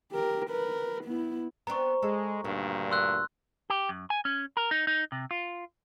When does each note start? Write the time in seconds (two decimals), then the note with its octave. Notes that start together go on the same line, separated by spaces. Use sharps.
0.12 G4 A#4
0.50 A#4 B4
1.04 B3 E4
1.67 B3 C4 D4 A#5 C#6
2.02 G#3 A4
2.44 D2 G2 A#2 D#3
2.91 C6 E6 F#6
3.70 G4
3.89 F#2
4.10 G#5
4.25 C#4
4.57 A#4
4.71 D#4
4.87 D#4
5.12 C3
5.31 F4